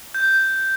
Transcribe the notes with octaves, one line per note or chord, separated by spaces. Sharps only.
G6